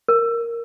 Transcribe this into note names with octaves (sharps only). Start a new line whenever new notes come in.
A#4